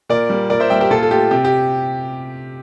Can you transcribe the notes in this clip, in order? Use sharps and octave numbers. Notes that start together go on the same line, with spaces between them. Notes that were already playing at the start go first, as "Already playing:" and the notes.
A#2 A#4 D5
G3 A#3
A#2 A#4 D5
C5 E5
G3 A#3 E5 G5
G4 A#4
A#2 F4 A4
A4
A3 G4
C3 G4
G4